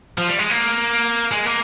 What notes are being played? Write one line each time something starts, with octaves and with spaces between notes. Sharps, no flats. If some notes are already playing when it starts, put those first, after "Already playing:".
F3
G3
G#3
A#3
G#3
A#3